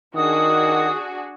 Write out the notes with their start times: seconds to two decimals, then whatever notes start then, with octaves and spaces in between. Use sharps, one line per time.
0.15 D#3 D4 F#4 G#4 D#6